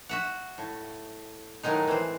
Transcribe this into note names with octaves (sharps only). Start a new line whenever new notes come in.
F#4 E5 F#5
A2
A2 D#3 F#3 G#3 D#4
E3 C4